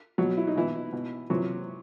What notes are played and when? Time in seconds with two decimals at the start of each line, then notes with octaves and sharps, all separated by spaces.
0.18 B2 F#3 F#4
0.37 E4
0.47 D#4
0.56 B2 E3 E4
0.93 B2
1.30 C3 E3 F#3 F#4